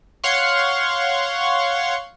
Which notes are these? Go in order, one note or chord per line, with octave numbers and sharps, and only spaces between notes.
C#5 F5 F#5 C6 C#6